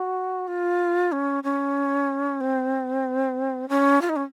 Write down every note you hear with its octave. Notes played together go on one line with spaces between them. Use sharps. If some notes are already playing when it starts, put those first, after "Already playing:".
Already playing: F#4
F4
C#4
C#4
C4
C#4
F4
D#4
C#4